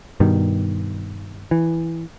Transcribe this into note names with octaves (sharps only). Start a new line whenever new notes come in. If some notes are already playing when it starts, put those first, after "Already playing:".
G2 B2 D#3
E3